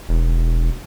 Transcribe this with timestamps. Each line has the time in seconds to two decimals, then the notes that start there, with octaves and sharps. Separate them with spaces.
0.09 E1